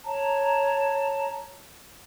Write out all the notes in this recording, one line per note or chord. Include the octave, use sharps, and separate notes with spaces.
C#5 A5 A#5